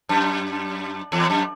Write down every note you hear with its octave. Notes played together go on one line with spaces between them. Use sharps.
F#2
E2
F#2